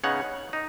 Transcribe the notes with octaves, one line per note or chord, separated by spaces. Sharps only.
C#3 B3 D#4 C#5 F#5
D#4